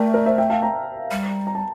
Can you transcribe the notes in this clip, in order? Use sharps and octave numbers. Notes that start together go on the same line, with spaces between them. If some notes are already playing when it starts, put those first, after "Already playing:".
Already playing: A3 A#4 D5 E5 G5 A5
A#4 D5
C5 E5
E5 G5
F5 A5
G5 A#5
G3
A#5
A5